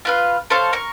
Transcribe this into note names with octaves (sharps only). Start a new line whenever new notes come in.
F4 B4 F5
A4 C5 C#5 F5
A#4 C#6